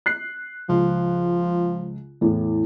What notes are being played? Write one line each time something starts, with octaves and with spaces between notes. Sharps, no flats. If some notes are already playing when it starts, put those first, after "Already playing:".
F#6 C7
C#2 F3
E2 A2